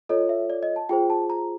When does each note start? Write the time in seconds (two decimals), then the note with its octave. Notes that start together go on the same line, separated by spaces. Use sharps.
0.09 F4 A4 C#5 D#5
0.29 E5
0.50 D5
0.63 D#5
0.76 A5
0.89 F4 G#4 C5 G5
1.10 A5
1.30 A#5